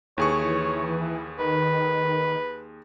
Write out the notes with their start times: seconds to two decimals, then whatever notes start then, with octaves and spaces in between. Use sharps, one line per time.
0.18 D#2 E3 G#4 C#5 C#6
1.39 D#3 B4